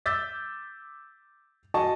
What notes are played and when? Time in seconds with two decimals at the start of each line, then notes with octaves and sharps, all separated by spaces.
0.06 D6 E6 G6 A6 B6
1.74 F#4 D#5 G#5 A5 C#6